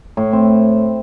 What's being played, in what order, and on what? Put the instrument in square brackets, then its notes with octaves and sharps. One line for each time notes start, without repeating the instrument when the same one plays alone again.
[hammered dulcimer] A2
C4